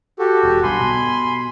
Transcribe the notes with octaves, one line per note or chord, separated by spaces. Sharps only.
F#4 G4 A4
E1
B1 G2 G#5 B5 C6
B2